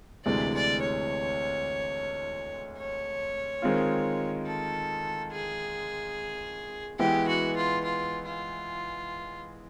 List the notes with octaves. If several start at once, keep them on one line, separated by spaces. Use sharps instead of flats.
D2 C3 E3 G#3 D5
D5
C#5
C#5
D#3 G#3 C4 F4
A4
G#4
E3 G#3 B3 E4 G4
F#4
F4
F4
F4